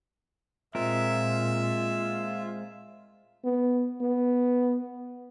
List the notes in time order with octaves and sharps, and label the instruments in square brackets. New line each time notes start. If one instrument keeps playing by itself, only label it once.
[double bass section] A#2 [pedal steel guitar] G#3 C4 A#4 [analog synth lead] F4 [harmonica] E5
[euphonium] B3
B3